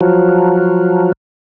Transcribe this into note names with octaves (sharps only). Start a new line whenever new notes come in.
F3 F#3